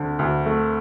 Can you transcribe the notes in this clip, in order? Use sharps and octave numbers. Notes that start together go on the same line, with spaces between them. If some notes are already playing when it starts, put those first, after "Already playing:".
Already playing: D2 D3
D2
A3